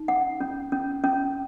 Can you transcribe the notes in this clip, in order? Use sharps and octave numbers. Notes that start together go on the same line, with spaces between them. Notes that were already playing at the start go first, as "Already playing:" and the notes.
Already playing: D#4
C#4 F#5
C#4
C#4
C#4